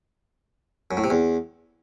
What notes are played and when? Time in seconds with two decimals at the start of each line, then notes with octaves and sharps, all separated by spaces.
0.91 F#2
0.97 A2
1.04 C3
1.10 E2